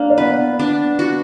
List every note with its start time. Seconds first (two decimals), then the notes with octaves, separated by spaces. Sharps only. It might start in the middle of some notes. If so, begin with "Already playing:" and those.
Already playing: A#3 D4
0.10 D4
0.18 B3 B4
0.59 D4
0.99 F#4